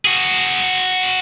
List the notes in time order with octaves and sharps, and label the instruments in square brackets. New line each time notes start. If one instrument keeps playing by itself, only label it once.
[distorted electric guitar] F#4 G#4